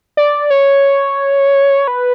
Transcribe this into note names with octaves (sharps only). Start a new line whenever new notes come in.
D5
C#5
B4